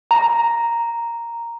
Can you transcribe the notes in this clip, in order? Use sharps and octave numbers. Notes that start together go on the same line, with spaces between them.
A#5